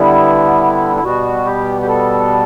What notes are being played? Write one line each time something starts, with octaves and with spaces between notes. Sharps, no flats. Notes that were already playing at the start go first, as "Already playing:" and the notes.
Already playing: D3 G3 B3 E4
E4
B2 G3 B3 F#4
G4
G4
A4